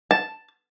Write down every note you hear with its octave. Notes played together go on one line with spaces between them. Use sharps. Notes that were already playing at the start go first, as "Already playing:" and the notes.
A5